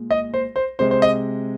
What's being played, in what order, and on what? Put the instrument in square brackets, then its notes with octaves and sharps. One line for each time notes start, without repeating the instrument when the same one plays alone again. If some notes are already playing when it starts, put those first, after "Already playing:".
Already playing: [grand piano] A#2 G#3
D#5
C5
C5
C3 G#3 C5
C5
D#5